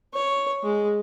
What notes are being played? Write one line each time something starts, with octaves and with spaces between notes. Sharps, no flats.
C#5
G#3